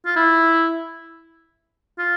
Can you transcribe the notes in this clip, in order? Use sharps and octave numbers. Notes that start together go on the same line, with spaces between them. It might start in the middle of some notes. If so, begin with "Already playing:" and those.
F4
E4
F4